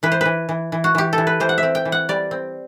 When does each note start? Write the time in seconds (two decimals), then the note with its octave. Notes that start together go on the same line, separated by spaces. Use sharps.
0.03 E3 B4
0.12 C5
0.21 E3 B4
0.49 E3
0.72 E3
0.84 F#4
0.95 E3 G4
1.13 A4
1.18 E3
1.27 B4
1.40 E3 C5
1.49 F#5
1.58 E5
1.63 C4
1.75 G5
1.85 E3
1.92 F#5
2.09 G3 D5
2.31 C4